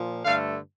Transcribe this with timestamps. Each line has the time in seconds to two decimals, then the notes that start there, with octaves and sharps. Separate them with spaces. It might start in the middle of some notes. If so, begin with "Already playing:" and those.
Already playing: A#2 F3
0.25 G2 D3 A3 F5